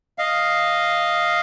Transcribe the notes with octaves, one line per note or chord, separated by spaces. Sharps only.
D#5 F5